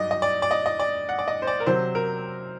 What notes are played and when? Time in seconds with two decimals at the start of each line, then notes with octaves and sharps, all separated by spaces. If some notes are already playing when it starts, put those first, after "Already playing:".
Already playing: G2 F#3 D#4 D5 D#5
0.11 D#5
0.22 D5
0.42 D5
0.51 D#5
0.66 D#5
0.80 D5
1.09 F#5
1.19 D5
1.28 D#5
1.42 C5
1.47 D5
1.60 A#4
1.66 C3 F#3 C4 C5
1.95 A#4